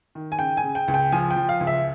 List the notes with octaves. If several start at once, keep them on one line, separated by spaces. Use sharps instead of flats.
D#3
G#5
C#3 G5
G#5
C#3
G5
C#2
G5
F3 G#5
G5
F3
F5
C#2
E5